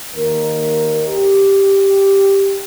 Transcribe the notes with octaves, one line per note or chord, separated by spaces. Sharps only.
D#2 A#4
G4